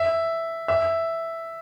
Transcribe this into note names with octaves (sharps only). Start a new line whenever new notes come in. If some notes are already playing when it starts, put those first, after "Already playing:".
Already playing: E5
E5